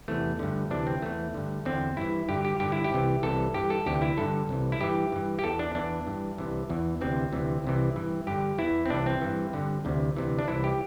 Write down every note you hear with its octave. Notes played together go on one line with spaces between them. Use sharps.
E2 C3 E3 A3
G2 D3
D2 C3 E3 D4
C4
E2 E3 A3
G2 D3
E2 D3 C4
G2 E3 E4
G2 D3 G4
G4
G2 D3 G4
E4
G4
C2 C3 E3
C2 C3 E3 A4
G2 E3 G4
A4
D2 C3 E3 G4
E4
G2 D3 A4
C2 C3 E3
E4
G2 E3 G4
G2 E3
G4
E2 E3 A4
D4
E2 E3 D4
G2 E3
C2 C3 E3
E2 E3
D2 C3 E3 C4
D2 C3 E3
C2 C3 E3
G2 E3
G2 D3 G4
E2 E3 E4
C4
C2 C3 E3 D4
C4
G2 E3
G2 D3
D2 C3 E3
D2 C3 E3
D4
C2 C3 E3 E4
G4